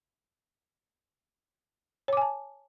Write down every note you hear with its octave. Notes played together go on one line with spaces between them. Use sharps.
C#5 G#5 A5 D6